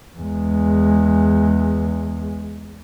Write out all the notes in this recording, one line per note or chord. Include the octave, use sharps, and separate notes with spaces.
E2 G#3